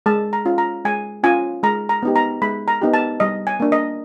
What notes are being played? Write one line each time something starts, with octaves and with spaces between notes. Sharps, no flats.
G#3 A5
A#5
C#4 F4
A#5
G#3 G#5
C#4 F4 G#5
G#3 A#5
A#5
B3 D#4 G4
A#5
G#3 B5
A#5
B3 D#4 G4
A5
G3 D#5
G#5
A#3 D4
D#5